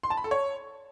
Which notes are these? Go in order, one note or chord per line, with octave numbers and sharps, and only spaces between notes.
C6
A5
B5
A4
C#5